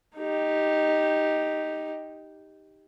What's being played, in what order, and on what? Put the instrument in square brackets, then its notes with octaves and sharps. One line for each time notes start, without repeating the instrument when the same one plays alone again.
[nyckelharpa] D#4 G4